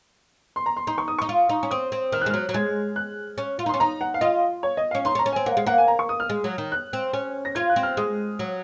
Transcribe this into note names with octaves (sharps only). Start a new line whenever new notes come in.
C6
A#5
C6
D#4 C6
C#6
D#6
D#4 C#6
F4
D#4
C#4
C4 D#6
C4
D#3 F6
F#6
G#3
F#3 F6
F#3
G#3 G#6
F#6
C#4
F4
D#4
C#4 C6
D#4 A#5
F#5
F5
F4 D#5
C#5
D#5
C#4 F5
D#4 C6
C#4
A#5
C#4
C4 G#5
A#3 F#5
G#3 F5
A#3 F#5
G#5
A#5
C#6
D#6
F6
G#3
F#3
D#3
F#6
C4
C#4
A#6
F4 G#6
F#6
C4
F6
G#3 D#6
F#3